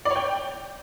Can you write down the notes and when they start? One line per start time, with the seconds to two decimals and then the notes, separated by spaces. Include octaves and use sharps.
0.05 D5
0.11 C#5
0.16 G5